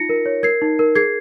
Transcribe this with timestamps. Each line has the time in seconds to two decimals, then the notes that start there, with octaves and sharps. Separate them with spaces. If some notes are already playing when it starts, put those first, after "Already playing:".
Already playing: D#4 F4 A#6 C#7
0.09 A#4
0.26 C#5
0.43 A#4 G#6 C7
0.62 D#4
0.79 A#4
0.95 G#4 G#6 C7